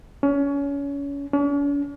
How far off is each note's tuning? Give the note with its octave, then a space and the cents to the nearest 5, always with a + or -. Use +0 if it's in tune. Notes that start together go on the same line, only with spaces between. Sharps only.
C#4 +25
C#4 +45